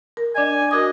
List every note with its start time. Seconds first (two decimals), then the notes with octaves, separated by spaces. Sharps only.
0.17 A#4
0.35 D4 D5 D#5 G#5
0.71 F#4 A#4 D#5 D6